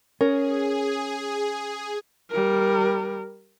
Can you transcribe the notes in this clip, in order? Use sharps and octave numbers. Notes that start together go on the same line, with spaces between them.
C#4 G#4 A#4
G3 A#4